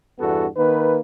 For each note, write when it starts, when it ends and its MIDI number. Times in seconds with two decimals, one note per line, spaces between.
0.19 0.45 40
0.19 0.45 43
0.19 0.45 59
0.19 0.45 66
0.19 0.45 69
0.56 0.99 51
0.56 0.99 58
0.56 0.99 71